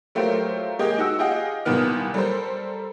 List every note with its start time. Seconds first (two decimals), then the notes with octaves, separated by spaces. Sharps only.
0.15 F#3 A3 F4 G4 A#4 C5
0.79 G#3 A#3 G4 G#4 D#5
0.98 D#4 F#4 E6
1.19 F4 G4 G#4 D#5 F5 F#5
1.65 C2 A#2 D#3 B3 F6
2.14 G3 A4 A#4 C5